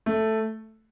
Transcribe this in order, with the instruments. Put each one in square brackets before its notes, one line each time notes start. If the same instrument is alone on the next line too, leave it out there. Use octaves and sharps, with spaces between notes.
[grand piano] A3